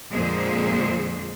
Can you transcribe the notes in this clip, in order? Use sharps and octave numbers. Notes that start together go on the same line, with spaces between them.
F2 A#2 D3 G#3 G#4 C5